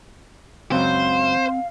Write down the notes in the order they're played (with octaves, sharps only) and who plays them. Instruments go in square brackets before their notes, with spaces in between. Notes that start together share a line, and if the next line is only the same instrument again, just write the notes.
[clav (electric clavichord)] C#2 F#2 F#3 [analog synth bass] C4 [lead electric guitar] C5 [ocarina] F5